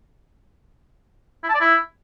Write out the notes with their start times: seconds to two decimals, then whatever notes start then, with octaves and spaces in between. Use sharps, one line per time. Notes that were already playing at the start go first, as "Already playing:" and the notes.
1.43 E4
1.49 A5
1.55 D5
1.60 E4